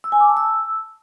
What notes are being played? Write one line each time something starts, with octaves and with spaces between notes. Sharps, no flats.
E6
G#5
D6
A5
E6